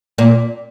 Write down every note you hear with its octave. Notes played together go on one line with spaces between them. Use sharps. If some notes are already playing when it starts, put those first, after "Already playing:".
A#2